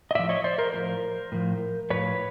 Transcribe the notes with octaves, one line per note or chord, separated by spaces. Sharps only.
D#5
A2 F3 D5 E5
C#5 D#5
C5 D5
A#4 C5
A2 F3 A#4 C5
A2 F3
A2 F3 B4 C#5